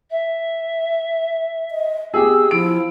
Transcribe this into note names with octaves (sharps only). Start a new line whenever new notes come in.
E5
D#5
B3 G4 G#4 E6
F3 E4 D7